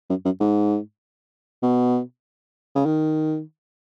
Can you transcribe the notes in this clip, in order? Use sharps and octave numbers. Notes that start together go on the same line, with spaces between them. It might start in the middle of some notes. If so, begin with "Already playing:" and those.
F#2
F#2
G#2
B2
C#3
D#3